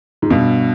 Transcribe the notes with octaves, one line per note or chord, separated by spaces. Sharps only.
G#2
G2 B2